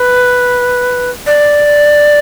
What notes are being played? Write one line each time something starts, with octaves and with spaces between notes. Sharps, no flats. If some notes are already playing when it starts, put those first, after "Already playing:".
Already playing: B4
D5